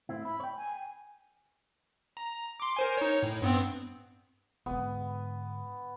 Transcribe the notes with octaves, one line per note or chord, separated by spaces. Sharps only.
A2 C4 E4
E4 B5
C#5 G5
G#5
A#5
C6 D6
A#4 C5 G#5
D#4 C#5
A2
G2 B3 C4
G#2 D3 B3